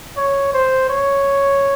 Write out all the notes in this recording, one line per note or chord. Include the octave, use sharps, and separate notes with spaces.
C#5
C5
C#5